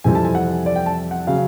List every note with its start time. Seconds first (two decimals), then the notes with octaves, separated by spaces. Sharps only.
0.04 F2 C3 E3 G3 C4 G#5
0.15 A5
0.24 G#5
0.35 F#5
0.66 D5
0.76 G5
0.86 A5
1.11 F#5
1.27 C#3 F#3 F5